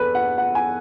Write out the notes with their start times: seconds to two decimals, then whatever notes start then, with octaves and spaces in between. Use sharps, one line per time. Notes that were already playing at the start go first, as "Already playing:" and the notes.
Already playing: E2 A4 B4
0.15 F#5
0.38 F#5
0.55 G#5